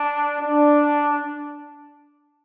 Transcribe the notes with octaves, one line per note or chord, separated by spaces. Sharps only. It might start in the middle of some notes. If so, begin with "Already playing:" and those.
Already playing: D4
D4